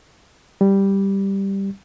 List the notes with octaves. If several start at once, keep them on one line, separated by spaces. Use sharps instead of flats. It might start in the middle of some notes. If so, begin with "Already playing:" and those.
G3